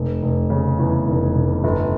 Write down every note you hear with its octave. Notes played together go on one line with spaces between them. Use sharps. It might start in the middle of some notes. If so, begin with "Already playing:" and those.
Already playing: F1
F1
C#3
E2
F1
F1
G1